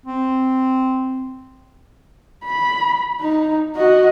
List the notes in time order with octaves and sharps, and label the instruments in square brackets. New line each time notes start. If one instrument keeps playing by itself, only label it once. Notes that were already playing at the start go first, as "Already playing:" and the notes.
[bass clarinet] C4
[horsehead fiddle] B5
D#4
F#4 D#5